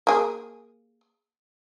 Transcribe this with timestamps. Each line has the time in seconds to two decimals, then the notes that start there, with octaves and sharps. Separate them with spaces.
0.07 A#3 G#4